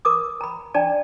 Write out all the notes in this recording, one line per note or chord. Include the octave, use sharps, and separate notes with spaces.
A#4 D6 D#6
A#5 B5
D4 D5 G5 A5